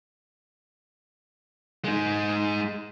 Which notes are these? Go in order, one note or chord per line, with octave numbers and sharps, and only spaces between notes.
G#3 D#4